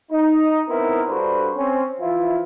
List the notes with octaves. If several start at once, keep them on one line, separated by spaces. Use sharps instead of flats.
D#4
B3 C4 D#4 E4 A#4
G2 D4 F#4 A4 B4 C5
C4 C#4
E3 F3 E4 F4